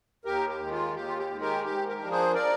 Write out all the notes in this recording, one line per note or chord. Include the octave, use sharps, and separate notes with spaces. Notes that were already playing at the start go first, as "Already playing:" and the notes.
D#2 G4 A#4
G4
D#3 G#3
F4
D#2 G4
F4
G4
D#3 G#3
G4 A#4
G#2 G4
G4 A#4
F3 A#3 D4
G#4 C5
A#4 D5